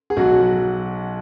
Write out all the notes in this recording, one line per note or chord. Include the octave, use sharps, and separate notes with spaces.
G#4
B1 F#3 F#4
F#3